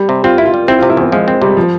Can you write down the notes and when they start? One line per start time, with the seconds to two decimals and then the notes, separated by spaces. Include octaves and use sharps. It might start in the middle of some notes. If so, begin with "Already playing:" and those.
Already playing: G3
0.09 C3
0.24 C4 F4
0.38 E4
0.45 F4
0.54 G3
0.68 C4 E4
0.79 F4
0.83 C3
0.90 E4
0.97 E2 C4
1.12 F3 G#3
1.28 C4
1.42 C3 G3
1.57 F3